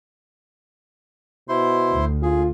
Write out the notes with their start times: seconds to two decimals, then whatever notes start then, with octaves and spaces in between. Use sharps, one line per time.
1.49 B2 E4 C5 C6
1.92 D2
2.23 F4 G#4